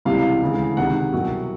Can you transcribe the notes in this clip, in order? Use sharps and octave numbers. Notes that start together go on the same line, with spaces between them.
C#2 C3 E3 G3 F5
D2 C#3 E3 G#3
C#2 C3 D#3 F#5
C2 B2 F#3